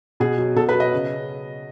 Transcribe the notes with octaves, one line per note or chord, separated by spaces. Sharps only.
B2 G#4
F#3
B2 A4
B4
F#3
D#5
C#3